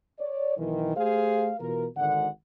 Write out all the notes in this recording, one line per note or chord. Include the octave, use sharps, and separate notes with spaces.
C#5 D5
B1 D#3 E3
A3 G4 G#4 C5 F5
B2 E3 F4 A#4
G#1 D3 F#5